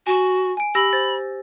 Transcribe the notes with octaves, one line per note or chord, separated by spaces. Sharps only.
F#4 G#5
G#5 D7
G4 B5 E6 A#6
C5 A6